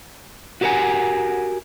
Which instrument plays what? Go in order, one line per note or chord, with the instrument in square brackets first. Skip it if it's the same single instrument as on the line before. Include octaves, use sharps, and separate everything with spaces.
[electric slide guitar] F#4 G4 A#4 B4 F#5 G#5